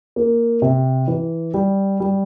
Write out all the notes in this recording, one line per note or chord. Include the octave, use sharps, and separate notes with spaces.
A#3
C3
E3
G3
G3